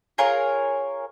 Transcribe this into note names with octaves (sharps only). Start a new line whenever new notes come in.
F4 G#4 A#4 C#5